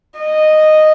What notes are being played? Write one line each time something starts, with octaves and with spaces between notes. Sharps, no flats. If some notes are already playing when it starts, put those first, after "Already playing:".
D#5